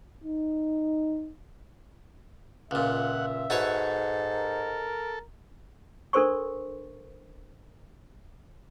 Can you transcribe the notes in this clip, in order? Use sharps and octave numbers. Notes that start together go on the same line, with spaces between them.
D#4
C#2 A#2 E5 F#5
G#2 F#4 A4 B4 C#5
A#4
D4 A4 A#4 C5 C6 C#6